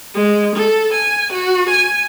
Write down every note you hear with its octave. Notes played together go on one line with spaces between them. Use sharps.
G#3
A4
G#5
F#4
G#5